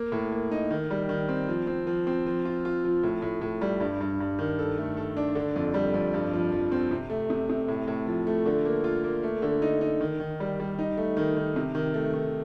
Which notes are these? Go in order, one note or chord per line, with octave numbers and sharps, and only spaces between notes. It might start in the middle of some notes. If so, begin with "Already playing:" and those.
Already playing: A#3
A2
A#3
D#4
D#3
G3
D#3
C4
F3
C4
F3
C4
F3
F4
F4
F3
A2
A2
A2
G3
G2
G2
G2
D#3
A4
A3
A4
D4
D3
F2
G3
F2
G2
F3
F3
C4
C3
A3
C3
C3
A2
A2
F3
A3
D3
A#3
F4
A#3
A3
D3
D#4
D#4
D#3
D#3
G3
G3
D#4
A3
D#3
D#3
C3
D#3
A3
D#3